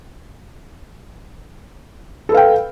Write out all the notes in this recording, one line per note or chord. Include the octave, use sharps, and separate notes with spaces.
A4 B4 F5 G5